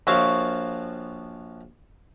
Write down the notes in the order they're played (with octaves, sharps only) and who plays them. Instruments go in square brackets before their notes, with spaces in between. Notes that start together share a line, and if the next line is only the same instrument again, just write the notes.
[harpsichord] A#1 F3 F#4 C#5 E5 F5